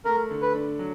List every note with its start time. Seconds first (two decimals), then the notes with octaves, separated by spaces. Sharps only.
0.05 A3 A#4
0.30 D3
0.42 B4
0.54 D4
0.79 F#3